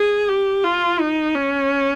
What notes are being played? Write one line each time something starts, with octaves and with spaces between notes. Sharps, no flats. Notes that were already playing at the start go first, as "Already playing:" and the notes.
Already playing: G#4
G4
F4
D#4
C#4